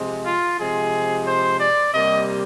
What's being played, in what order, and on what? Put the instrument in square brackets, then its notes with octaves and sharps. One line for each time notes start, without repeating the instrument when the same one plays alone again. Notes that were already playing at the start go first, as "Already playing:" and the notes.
Already playing: [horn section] C3 F3 G#3
F4
C3 F3 G#3 G#4
C5
D5
C3 G3 A#3 D#5